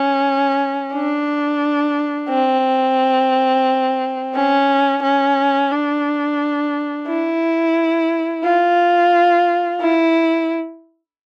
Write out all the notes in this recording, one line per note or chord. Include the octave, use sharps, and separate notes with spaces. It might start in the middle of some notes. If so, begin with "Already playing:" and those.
Already playing: C#4
D4
C4
C#4
C#4
D4
E4
F4
E4